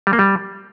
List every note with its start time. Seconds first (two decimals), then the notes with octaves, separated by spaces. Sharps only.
0.07 G3
0.13 A#3
0.19 G3